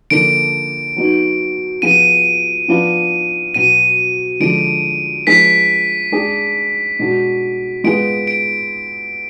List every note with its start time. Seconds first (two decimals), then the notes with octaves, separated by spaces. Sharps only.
0.10 D3 F3 A#3 D4 D7
0.96 F#3 B3 D#4
1.82 F3 B3 F4 G#4 D#7
2.68 F3 B3 D4 F4 B4
3.54 B2 F#3 B3 D#7
4.40 D3 F3 G#3 D4 G#4 D7
5.27 F3 G#3 D4 G#4 B4 B6
6.12 G#3 D4 G#4
6.99 B2 G#3 D4 F#4
7.84 G#3 B3 F4 G#4 B4 D7
8.27 D7